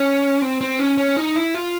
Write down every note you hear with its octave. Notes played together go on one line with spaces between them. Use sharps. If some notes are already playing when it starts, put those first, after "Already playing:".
Already playing: C#4
C4
C4
C#4
C#4
D#4
E4
F4